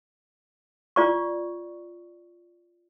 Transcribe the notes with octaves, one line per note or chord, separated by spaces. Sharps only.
F4 D5 C#6